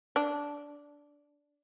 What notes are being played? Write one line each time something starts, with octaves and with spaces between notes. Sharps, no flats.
D4